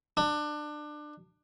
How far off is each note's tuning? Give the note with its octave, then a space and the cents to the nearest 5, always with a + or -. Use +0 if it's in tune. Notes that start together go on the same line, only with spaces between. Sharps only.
D4 +25